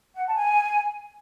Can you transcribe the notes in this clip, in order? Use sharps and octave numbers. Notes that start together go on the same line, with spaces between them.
F#5
A5
G#5